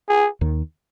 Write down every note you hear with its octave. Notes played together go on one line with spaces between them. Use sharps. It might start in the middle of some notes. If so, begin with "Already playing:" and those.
G#4
D#2 D#3